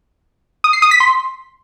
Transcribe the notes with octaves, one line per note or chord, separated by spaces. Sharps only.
D#6
C7
D#6
B6
C6